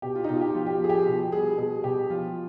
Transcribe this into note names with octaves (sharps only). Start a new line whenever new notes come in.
B2 G4
F4
D#4
B2 F4
G4
F3 F4
G4
F4
F3 G#4
G4
B2
G3 G#4
B2 G#4
B2 G4
F3 F4